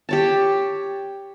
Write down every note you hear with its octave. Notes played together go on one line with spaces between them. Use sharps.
G4 C#5 A5